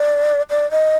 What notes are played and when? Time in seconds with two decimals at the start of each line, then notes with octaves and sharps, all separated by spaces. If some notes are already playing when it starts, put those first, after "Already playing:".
Already playing: D5
0.50 D5
0.71 D#5